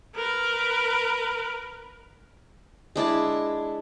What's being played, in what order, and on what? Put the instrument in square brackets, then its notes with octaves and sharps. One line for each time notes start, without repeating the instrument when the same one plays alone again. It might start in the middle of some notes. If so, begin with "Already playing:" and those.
[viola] A#4 B4
[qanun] G#3 D4 E4 A5